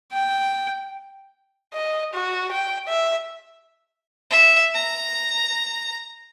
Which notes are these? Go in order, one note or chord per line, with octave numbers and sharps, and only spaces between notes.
G5
D#5
F#4
G5
E5
E5
A#5